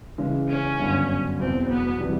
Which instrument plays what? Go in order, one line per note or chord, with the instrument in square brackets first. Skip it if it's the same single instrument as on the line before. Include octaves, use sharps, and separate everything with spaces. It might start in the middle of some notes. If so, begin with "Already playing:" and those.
[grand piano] C#3 E3 G#3
[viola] C#4
[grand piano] G1 F#2 D3
[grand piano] E2 B2 F#3 [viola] C4
[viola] B3
[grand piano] C3 E3 G3